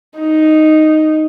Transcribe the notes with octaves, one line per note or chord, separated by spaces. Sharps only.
D#4